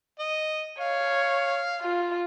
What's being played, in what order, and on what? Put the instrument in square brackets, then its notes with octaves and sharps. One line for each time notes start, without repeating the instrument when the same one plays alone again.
[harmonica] D#5
[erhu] C#5 [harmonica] F5
[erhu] F4